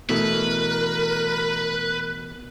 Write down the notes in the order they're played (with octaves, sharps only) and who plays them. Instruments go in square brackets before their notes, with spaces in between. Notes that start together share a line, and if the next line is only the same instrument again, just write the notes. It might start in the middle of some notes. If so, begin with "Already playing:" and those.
[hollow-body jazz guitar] B2 E3 A3 [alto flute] A#4 [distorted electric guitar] B4